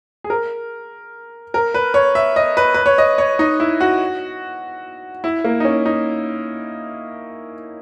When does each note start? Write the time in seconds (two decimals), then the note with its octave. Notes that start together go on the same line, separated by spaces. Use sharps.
0.24 G#4
0.30 A#4
1.54 A#4
1.74 B4
1.94 C#5
2.15 E5
2.36 D#5
2.57 B4
2.74 B4
2.86 C#5
2.98 D#5
3.18 C#5
3.39 D#4
3.60 E4
3.80 F#4
5.24 E4
5.44 A#3
5.60 D#4
5.65 C#4
5.86 D#4